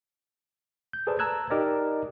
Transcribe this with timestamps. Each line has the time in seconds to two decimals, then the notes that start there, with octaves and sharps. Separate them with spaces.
0.93 G6
1.07 G#4 A4 B4 C5 D5 A5
1.19 A5 A#5 E6 F#6 G#6
1.50 D#4 G4 A#4 D5 D#5